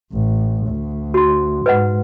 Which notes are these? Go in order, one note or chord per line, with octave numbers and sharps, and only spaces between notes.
A1
D2
F#4 C6
G#2 B4 D#5 F#5